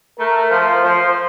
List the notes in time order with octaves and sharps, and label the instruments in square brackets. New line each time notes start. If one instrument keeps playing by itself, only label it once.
[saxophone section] A3 [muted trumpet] A#4
[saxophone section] F3 [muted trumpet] C5
[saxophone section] F3 [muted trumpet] C5